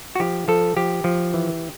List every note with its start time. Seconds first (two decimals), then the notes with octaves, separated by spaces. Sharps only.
0.15 F#4
0.20 F3 G4
0.48 F3 A4
0.76 F3 G4
1.04 F3
1.34 E3